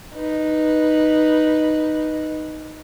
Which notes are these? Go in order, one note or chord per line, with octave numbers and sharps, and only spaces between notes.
D#4 B4